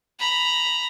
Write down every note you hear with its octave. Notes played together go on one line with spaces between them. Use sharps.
A#5 B5